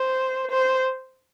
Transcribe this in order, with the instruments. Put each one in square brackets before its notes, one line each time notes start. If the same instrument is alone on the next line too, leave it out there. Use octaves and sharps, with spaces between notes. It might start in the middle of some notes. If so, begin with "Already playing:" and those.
Already playing: [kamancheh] C5
C5